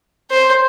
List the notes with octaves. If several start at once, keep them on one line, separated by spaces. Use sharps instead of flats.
C5